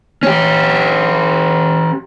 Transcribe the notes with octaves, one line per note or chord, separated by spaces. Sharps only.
C#4 G4